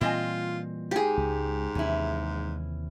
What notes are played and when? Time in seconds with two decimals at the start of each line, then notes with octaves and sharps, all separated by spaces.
0.01 A#2 E3 G3 C4 F4 D#5 G#5
0.91 G#2 G4 G#4
1.17 C#2
1.75 D#2 C3 E3 C#4 E4